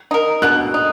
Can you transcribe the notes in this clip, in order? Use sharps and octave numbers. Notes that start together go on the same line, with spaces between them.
D#4 A#4
B2 F#6
D#4